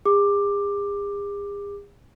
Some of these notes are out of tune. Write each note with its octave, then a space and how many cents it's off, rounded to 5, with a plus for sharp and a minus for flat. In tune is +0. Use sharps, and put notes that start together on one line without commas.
G#4 -45 D6 +10